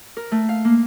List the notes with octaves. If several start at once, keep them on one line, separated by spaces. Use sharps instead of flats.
A#4
A3
F5
A#3